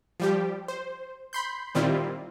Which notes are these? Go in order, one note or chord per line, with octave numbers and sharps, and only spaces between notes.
F3 G3 G4
C5
B5 C6 G6
A#2 D#3 G3 C4 E4 F4